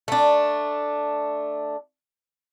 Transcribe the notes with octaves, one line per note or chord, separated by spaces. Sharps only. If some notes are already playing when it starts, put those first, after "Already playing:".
A3 D4